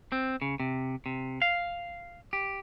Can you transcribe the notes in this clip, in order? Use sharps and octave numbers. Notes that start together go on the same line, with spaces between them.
C4
C#3
C3
C3
F5
G4